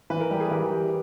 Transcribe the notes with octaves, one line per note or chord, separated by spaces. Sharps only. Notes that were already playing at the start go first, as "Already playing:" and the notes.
E3 B4
A#4
G3 G4
G#4
E3 A#4
G4